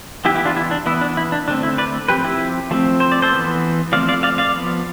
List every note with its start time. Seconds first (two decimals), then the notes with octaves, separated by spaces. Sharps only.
0.25 E3 B3 E4 G4
0.35 E4 G4
0.45 D4 F4
0.57 E4
0.71 D4
0.86 E3 B3 E4
1.01 D4
1.17 E4
1.32 D4
1.48 D3 A3 C4 D4
1.63 E4
1.78 B4 D5
2.08 F3 C4 G4 B4
2.25 E4 G4
2.71 F3 A3 C4
3.00 C5
3.12 D5
3.22 A4 C5
3.32 E3 B3
3.92 F3 A3 C4 D5 F5
4.09 D5 F5
4.23 D5 F5
4.38 D5 F5
4.54 F3 B3